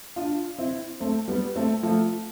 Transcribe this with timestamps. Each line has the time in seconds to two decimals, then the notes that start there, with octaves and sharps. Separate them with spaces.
0.16 D4 F4
0.58 C4 E4
1.00 A3 C4
1.28 G3 B3
1.55 A3 C4
1.83 F3 A3